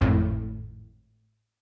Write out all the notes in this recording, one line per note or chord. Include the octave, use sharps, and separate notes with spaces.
G#1 F2 A2